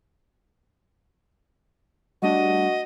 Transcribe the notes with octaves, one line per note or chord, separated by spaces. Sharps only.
G3 A3 D4 F#4 D#5